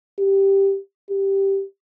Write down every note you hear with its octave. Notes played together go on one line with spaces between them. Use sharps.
G4
G4